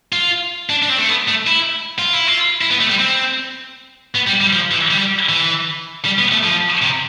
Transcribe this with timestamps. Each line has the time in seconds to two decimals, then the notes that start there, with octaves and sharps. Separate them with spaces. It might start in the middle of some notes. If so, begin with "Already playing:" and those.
0.12 F4
0.70 D4
0.82 D4
0.90 C4
0.98 A3
1.09 B3
1.28 A3
1.47 E4
1.99 F4
2.13 E4
2.27 F4
2.61 E4
2.71 B3
2.80 A3
2.90 G3
2.99 C4
4.15 B3
4.27 G3
4.41 G3
4.53 F3
4.71 E3
4.91 G3
5.29 E3
6.05 G3
6.18 B3
6.31 A3
6.43 F3
6.82 C3